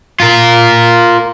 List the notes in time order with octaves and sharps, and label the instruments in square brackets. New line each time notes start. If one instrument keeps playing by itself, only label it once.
[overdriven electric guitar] F4 A#4